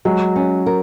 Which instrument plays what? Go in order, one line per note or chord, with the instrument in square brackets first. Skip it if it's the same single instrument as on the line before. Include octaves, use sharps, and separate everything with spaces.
[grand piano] F#3 [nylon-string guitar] G#3
[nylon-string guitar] C#4
A#4